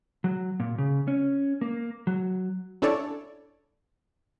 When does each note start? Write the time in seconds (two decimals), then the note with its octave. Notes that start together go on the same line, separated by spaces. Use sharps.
0.24 F#3
0.60 A#2
0.78 C#3
1.08 C#4
1.61 A#3
2.07 F#3
2.82 C#4 D4 E4 A4 C#5 D5